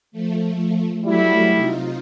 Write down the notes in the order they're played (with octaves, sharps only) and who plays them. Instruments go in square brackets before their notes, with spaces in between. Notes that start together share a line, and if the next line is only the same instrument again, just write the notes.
[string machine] F3 A3
[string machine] F#3 A3 F#4 [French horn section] G3 E4
[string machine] C3 D#4 F4